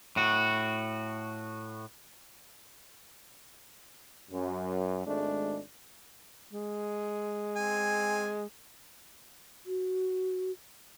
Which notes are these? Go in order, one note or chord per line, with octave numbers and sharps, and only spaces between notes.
A2 F#4
F#2
G#1 G#3 A3 D4
G#3
C4 G#5
F#4